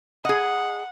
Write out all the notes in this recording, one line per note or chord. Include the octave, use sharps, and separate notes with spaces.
G#4 D#5 F#5